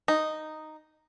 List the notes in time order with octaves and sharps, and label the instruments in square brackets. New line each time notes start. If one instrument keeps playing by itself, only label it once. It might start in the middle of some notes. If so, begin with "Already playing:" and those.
[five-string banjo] D#4